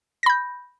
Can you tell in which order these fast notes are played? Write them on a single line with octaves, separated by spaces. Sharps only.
A#6 B5 G6